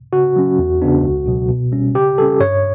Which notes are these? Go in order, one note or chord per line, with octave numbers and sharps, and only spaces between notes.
C#3 F#4
F#3 C#4
E2
C#3 E3 B3 D4
C#2
B2 F#3
B2
G3 C#4
C#3 G4
G3 C#4 A4
G2 C#5